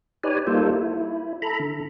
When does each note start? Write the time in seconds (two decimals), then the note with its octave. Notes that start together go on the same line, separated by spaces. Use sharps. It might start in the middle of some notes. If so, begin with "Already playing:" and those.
0.23 D#4 G4 B4 C#5 D5 G#5
0.47 G3 A#3 D#4 F4 A4 C5
0.73 E4
1.42 A4 A#5 B5
1.60 D3